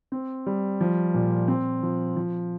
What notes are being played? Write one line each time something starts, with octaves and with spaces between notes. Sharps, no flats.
C4
G3
F3
A#2
C4
F3
F3